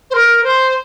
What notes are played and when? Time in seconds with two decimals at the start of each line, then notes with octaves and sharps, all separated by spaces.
0.11 C5
0.15 A#4
0.44 C5